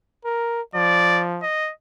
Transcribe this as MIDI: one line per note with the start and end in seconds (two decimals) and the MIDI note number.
0.25 0.61 70
0.75 1.43 53
0.75 1.23 74
1.42 1.71 75